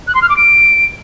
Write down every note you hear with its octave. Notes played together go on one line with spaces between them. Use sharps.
F#6
C6
F6
D6
D7